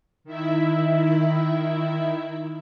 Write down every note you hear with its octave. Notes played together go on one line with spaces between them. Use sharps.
D#3 E4 E5